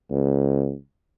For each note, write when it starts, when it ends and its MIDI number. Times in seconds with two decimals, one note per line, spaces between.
0.11 0.74 37